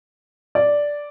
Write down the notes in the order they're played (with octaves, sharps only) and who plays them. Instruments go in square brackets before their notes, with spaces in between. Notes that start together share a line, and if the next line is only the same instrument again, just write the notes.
[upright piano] D5